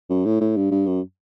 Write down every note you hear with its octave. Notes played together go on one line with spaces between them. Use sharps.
F#2
A2
A2
G2
G2
F#2